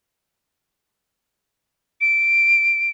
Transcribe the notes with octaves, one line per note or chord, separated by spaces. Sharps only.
D7